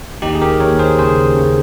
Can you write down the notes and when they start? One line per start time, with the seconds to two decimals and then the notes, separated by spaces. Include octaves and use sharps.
0.22 D#2 D#4 G4
0.35 G#4
0.42 G4 A#4
0.60 D#2 A#4 C#5
0.79 G#4 C5
0.98 C#3 G#4 C5
1.36 C#3